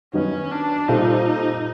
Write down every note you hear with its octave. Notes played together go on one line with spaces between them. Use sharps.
D#3 F#3 B3 C#4 D#4
D4
A#2 G3 C4 D#4 F4 A4